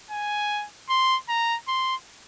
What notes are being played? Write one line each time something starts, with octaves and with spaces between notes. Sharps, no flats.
G#5
C6
A#5
C6